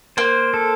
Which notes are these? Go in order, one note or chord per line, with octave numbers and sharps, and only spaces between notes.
A#3 C5
A4